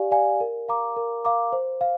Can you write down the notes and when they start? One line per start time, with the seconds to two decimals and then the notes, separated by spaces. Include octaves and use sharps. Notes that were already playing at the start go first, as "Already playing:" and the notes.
Already playing: G4 D5 F5 G#5
0.11 D5 F5 G#5
0.41 A#4
0.68 F5 A#5 D6
0.96 A#4
1.24 F5 A#5 D6
1.53 C5
1.81 F5